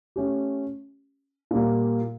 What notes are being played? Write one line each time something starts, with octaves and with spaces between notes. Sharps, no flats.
A3 C#4 G4
A#2 G3 A#3